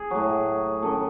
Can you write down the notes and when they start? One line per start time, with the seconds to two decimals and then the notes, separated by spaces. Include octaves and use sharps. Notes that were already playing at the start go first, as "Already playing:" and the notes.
Already playing: G#4
0.11 A2 F#3
0.83 F#2 D#3 F#3 A4